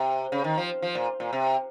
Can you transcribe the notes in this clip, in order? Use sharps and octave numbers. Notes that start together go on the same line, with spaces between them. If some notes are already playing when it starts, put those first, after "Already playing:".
Already playing: C3
C#3
D#3
F3
F3
A#2
A#2
C3